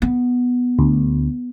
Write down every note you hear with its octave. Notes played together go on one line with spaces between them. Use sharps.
B3
D2